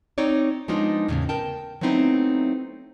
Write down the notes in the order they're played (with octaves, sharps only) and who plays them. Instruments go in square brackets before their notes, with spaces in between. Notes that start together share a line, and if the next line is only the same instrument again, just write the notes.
[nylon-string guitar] C4 D#4 C#5 D5
F3 G#3 B3 D4 D#4 F4
E2 A2 C#3
A#4 G5 A5
F#3 A3 B3 C4 D#4 E4